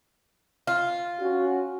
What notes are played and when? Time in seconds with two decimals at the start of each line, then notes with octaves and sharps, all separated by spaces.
0.67 F4
1.19 C#4 F#4